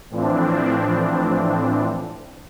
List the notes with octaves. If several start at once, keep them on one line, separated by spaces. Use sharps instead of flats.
A2 E3 F3 C4 D4